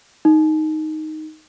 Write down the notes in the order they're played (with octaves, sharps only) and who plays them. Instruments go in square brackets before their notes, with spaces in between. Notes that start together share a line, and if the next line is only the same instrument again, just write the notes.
[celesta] D#4